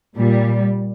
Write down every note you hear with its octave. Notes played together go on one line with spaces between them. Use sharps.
A#2 G3